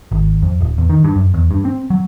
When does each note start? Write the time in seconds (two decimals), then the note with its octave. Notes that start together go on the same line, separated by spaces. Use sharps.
0.12 G#1
0.42 F2
0.61 D1
0.78 E2
0.89 D#3
1.04 G2
1.15 F#2
1.34 E2
1.51 G2
1.65 C4
1.90 F#3